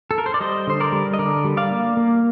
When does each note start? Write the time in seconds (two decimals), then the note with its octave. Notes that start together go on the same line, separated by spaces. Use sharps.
0.11 A4
0.18 A#4
0.26 C5
0.34 D5
0.40 G3 C5 D#5
0.67 D3 C5
0.80 A#4 D5
0.92 G3
1.14 D#5
1.19 D3 A#4 D5
1.44 G3
1.57 D5 F5
1.71 A#3
1.97 A#3